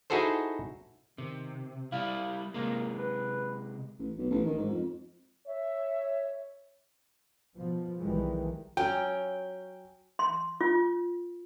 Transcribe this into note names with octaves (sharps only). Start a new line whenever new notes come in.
D#4 E4 F#4 G#4 A4 C5
C3 D#3
G3 E4 F5
C3 G#3 A#3
B4
A1
B1
A1
D#3
G#2
F2
C#5 E5
B2 F3
B1 D#3 E3 G3 G#3
F#3 C#4 G5
C6
F4